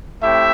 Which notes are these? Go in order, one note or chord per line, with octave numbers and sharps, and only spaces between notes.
A3 C4 E4 G4 E5